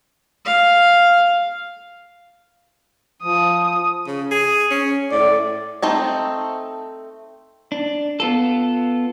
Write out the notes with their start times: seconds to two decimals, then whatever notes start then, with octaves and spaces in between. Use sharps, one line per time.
0.45 F5
3.23 F3 D#6
4.07 C#3
4.31 G#4
4.71 C#4
5.11 A2 D5
5.82 A3 C4 D#4
7.72 D4
8.20 B3 F4 A4